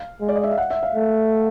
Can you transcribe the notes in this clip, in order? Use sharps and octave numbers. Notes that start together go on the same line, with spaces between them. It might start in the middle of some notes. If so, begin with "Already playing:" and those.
Already playing: F5
G#3
D5
D#5
E5
F5
F#5
E5
F5
A3